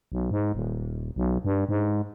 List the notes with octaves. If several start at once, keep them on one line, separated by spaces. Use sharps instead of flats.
B1
G#2
D#1
B1
G2
G#2